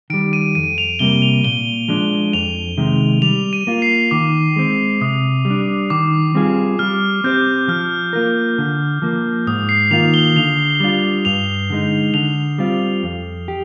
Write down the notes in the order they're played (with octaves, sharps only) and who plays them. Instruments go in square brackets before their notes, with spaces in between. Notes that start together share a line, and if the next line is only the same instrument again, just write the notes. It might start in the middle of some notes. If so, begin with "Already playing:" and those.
[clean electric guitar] D#3 G3 [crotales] D7
[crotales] D#7
[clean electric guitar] F2 [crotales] D#7
[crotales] F7
[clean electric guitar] C3 G3 A#3 [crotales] G7
[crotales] F7
[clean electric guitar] A#2 [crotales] G7
[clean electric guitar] F3 G#3 D4
[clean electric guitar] F2 [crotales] F7
[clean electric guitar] C3 D#3 G#3
[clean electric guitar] G3 [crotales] F7
[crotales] D#7
[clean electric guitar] A#3 F4
[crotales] C7
[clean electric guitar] D#3 [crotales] D6
[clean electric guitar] G#3 C4
[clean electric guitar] C3 [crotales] D#6
[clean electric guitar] G3
D4
[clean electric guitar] D#3 [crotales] D6
[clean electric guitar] G3 C4 F4 G#4
[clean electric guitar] G3 [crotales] F6
[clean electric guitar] C4 G4 C5 [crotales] G6
[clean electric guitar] F3 [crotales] F6
[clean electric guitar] A#3 F4 A#4
D3
F3 A#3
[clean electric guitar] G#2 [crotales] D#6
[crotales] C7
[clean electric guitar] D#3 A#3 F4 [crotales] F7
[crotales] G7
[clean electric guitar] D3 [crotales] F7
[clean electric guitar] G3 D4 F4
[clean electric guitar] G2 [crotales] F7
[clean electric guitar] D3 G#3 D#4
[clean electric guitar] D3 [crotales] F7
[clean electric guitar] G3 C4 F4
F2
G4